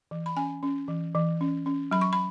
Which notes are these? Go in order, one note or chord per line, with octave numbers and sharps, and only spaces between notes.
E3
B5
C#4 G#5
C#4
E3
E3
C#4
C#4
F#3 B5
C#6
B5